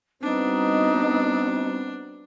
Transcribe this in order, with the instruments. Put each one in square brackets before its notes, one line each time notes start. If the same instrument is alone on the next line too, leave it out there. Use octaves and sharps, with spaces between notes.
[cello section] G3 B3 F#4 [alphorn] C4 [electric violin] D4 [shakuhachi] D#4